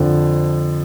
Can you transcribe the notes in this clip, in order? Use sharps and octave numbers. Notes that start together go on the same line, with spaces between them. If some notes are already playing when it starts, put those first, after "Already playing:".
Already playing: F2 D3 F3